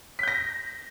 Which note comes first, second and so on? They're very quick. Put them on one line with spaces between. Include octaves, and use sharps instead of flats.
B6 G6 A#6